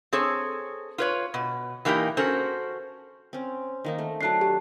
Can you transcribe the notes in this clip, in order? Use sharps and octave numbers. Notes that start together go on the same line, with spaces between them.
C4 G#4 A4 C#5
F4 B4 C#5
B2
E3 A#3 D#4 F#4 G4
C#4 F#4 A4 A#4 C5
C4 C#4
D#3 A#3 D#4
A3
F#3 A3 D4 A5 F#6 C7
G4